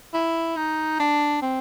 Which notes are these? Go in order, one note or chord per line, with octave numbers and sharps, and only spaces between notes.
E4
D#4
D4
C4